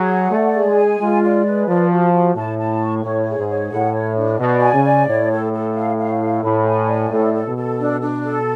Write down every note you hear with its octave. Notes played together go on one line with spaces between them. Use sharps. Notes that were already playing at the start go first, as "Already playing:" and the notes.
Already playing: F#3 G#4
F#5
A3 D5
G#4
G#3
G#5
G#3 F4
D5
B4
F3 D5
F#4
F#4
A2 A5
A5
C#6
A2 C#5
G#4
G#2
C#5
A2 F#5
C#5
D4
B2 D5
G#5
C#3
D5
A2 C#5
A4
A4
F5
F5
A4
A2 B5
G#5
D5
A2 A4
A4
B2
A4
D4
D4
A4